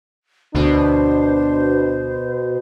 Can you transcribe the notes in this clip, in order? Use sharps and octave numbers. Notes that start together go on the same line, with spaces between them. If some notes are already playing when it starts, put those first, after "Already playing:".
D2 B2 D4 C5